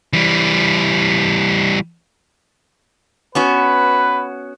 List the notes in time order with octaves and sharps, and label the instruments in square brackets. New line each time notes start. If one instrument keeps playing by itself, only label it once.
[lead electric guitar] E3 G3
[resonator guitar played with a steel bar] B3 C#4 F#4 [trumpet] B4